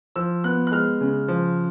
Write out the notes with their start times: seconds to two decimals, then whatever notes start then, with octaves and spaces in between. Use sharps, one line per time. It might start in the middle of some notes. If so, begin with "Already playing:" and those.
0.16 F3 E6
0.44 B3 F#6
0.67 F#6
0.72 G#3 F6
1.01 C#3
1.28 F3